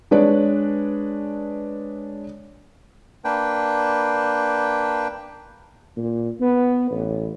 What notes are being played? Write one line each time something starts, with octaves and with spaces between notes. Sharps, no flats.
G#3 D4 B4 C#5 D5
A#3 D4 B4 G5
A#2
B3
A1